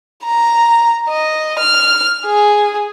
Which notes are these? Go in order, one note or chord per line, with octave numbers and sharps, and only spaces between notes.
A#5
D#5
F6
G#4